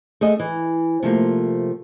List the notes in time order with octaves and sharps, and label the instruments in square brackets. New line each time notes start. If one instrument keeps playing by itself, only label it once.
[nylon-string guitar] A3 G#4 D#5
E3
C3 F3 A3 A#3